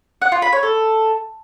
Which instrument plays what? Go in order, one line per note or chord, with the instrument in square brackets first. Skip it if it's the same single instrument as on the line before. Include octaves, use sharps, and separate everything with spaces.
[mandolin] F#5
F4
B5
C#5
A4